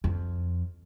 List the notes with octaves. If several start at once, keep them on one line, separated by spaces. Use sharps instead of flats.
F2